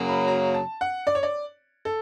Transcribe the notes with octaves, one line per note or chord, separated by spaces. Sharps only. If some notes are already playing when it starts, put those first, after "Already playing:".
Already playing: F#2 C#3 F#3 A#3
B5
A#5
A5
F#5
D5
C#5
D5
A4